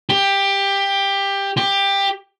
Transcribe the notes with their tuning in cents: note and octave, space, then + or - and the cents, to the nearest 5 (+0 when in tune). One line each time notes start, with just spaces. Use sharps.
G4 +15
G4 +15